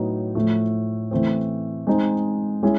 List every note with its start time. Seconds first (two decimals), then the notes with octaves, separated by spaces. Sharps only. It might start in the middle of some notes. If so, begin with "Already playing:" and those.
Already playing: A2 F#3 B3 D#4
0.35 A2 F3 A3
1.11 E3 A3 C4
1.87 G#3 C4 D#4
2.63 G#3 C#4 E4 G#4